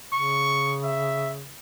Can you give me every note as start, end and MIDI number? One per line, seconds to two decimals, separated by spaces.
0.13 1.52 49
0.13 0.76 85
0.84 1.32 76